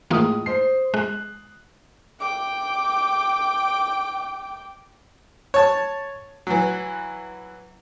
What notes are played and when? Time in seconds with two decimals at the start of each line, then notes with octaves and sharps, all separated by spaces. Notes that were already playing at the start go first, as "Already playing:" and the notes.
0.10 A2 E3 G#3 A#3 F4 D#6
0.46 C5 C7
0.94 G#3 F#6
2.20 G5 D6
5.54 C#5 A5
6.47 E3 F#3